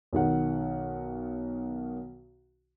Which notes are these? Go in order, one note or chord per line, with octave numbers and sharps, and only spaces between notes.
B1 D#3 F#5